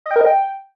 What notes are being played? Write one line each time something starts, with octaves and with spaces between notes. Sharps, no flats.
D#5
G5
A#4
D#5
G5